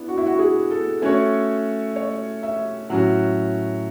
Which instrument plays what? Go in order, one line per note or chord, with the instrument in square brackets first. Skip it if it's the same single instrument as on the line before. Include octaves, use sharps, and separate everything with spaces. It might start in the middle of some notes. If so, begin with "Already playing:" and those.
Already playing: [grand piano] B3 D4 [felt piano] E4
[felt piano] F#4
E4
F#4
G#4
A4
[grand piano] A3 C#4 F#4 C#5
[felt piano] C#5
E5
[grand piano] A2 F#3 C#4 F#4